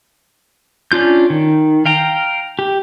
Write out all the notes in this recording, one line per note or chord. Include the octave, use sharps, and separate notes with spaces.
C#4 D4 F4 G6
D#3
F5 G5 A#5
G4